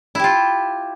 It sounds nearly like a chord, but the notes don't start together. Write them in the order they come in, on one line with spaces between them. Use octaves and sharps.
E4 G4 F4